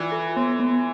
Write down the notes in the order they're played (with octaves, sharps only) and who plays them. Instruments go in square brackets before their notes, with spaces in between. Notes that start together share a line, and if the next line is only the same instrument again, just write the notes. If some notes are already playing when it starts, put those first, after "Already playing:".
Already playing: [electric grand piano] E3 [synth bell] F4 D5
[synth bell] A4
B3
B3